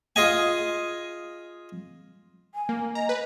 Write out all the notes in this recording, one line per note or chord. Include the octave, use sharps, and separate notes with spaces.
F4 G#4 D#5 G#5
G#5
A#3
D#5 A#5
B4